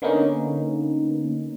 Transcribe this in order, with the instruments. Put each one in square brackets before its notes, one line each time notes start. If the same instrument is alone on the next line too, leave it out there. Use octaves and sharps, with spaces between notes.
[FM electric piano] D3 A#3 B3 C#4 D#4